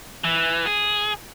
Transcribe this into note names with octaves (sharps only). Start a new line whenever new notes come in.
E3
G#4